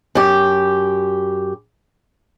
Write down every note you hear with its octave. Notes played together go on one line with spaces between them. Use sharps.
F#2 G4